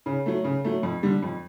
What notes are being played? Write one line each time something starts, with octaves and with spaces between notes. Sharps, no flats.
C#3
F#3 A3
C#3
F#3 A3
F2
D3 G3
F2